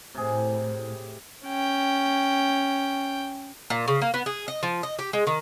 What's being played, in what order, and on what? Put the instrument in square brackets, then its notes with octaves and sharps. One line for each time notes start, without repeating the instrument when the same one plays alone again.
[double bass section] A2 [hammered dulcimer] C3 G#4
[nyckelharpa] C#4 G5
[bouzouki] A#2
C#3
A#3
B3
G#4
D#5
F3
D#5
G4
G#3
D#3